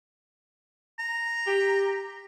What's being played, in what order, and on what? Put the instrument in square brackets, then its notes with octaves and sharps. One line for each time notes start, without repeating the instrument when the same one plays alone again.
[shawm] A#5
[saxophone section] G4